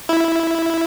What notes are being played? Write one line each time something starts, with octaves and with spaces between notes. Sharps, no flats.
E4